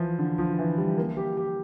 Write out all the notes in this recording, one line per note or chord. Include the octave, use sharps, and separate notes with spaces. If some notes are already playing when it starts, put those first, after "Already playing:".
Already playing: E3 F3
D3
F3
E3
G3
A#3
G4
G4